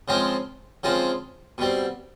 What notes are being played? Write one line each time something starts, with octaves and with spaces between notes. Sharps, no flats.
C#3 F3 G#3 C4 F4
C#3 F3 G#3 C4 F4
B2 G3 C4